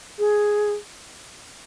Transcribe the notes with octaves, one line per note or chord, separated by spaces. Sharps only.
G#4